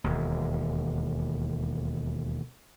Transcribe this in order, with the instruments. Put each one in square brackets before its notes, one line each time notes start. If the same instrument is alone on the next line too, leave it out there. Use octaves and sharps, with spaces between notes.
[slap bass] E1 D#2